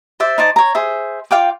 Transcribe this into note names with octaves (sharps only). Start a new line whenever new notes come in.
C5 D5 E5
D#4 C5 D5 A5
C#5 A#5
G#4 C5 E5
F4 F5 G5 D6